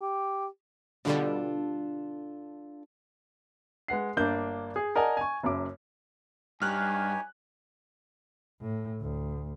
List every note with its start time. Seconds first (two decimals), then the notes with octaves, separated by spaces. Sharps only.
0.01 G4
1.05 B2 D3 G3 D4 F4 A4
3.88 G#3 B4 F#5 C7
4.17 G1 A#3 D4 G6
4.76 G#4
4.95 A#4 D5 D#5 F#5 G#5 A5
5.17 G#5 C#6
5.43 F#1 F#2 D6
6.62 G2 D#4 G4 C#5 G#5 F6 F#6
8.61 A2
9.01 D2